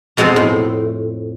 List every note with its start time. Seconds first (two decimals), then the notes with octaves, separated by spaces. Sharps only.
0.17 F2 B2 G#3 C4 C5
0.36 A2